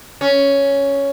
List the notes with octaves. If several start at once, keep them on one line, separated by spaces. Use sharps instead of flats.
C#4